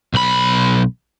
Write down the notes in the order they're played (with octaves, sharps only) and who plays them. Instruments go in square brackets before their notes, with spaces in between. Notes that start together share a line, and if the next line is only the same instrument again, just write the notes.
[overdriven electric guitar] B1 B5